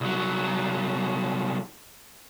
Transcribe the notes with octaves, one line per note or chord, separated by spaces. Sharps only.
C2 F#3